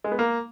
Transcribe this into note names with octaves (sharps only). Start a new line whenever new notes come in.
G#3
B3
A#3